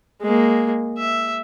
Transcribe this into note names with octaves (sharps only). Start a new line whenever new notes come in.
G#3 A#3
E5